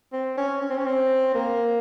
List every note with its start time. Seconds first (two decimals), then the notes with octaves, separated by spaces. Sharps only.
0.13 C4
0.37 C#4
0.62 C#4
0.70 C4
0.78 C#4
0.86 C4
1.35 A#3